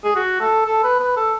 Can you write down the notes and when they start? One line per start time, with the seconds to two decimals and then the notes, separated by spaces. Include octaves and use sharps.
0.04 G#4
0.15 F#4
0.40 A4
0.65 A4
0.83 B4
0.99 B4
1.16 A4